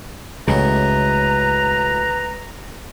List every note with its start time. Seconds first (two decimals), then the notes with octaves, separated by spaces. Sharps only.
0.48 C#2 A2 C#3 F#3 G#3 B4 A#5